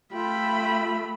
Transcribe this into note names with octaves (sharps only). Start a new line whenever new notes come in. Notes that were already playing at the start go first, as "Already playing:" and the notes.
A3 F4 G5 B5